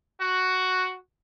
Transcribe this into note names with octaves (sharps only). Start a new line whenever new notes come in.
F#4